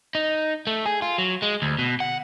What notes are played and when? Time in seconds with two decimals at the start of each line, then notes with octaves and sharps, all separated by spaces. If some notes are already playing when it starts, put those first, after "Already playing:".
0.15 D#4
0.67 A3
0.86 G#4
1.02 F4
1.18 F#3
1.42 G#3
1.62 D2
1.79 B2
2.00 F#5